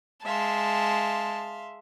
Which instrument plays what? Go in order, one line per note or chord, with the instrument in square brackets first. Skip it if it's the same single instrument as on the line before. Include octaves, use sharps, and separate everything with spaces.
[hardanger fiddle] G#3 A5 [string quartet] E5 F5 C6